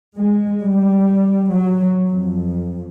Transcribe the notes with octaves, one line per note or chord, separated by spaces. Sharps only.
G#3
G3
F#3
F2